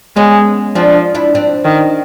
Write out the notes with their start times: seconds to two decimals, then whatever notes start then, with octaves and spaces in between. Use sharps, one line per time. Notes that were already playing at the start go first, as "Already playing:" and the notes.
0.16 G#3 B3 C#4
0.75 F3 C4 D4
1.15 D4 E4
1.35 C4 D4
1.65 D#3